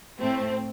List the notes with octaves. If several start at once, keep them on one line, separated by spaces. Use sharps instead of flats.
A2 A3 C4